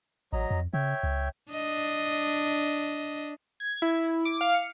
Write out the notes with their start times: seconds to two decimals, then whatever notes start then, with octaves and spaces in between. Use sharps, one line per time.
0.33 A1 F#3 D#5 A#5
0.51 F2
0.74 C#3 C#5 E5 G5
1.03 C#2
1.52 D4 D#5
3.60 G#6
3.82 E4
4.25 D6
4.41 F5
4.54 C#7